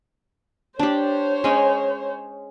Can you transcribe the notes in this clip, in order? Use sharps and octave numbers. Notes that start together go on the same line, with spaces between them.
D4 G4 C5 C#5
G#3 C#4